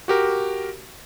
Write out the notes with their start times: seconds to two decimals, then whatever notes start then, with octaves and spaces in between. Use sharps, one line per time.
0.08 F#4 G4 A#4